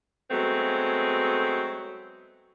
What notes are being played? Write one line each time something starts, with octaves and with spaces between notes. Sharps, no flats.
F#3 G#3 A3 B3 C4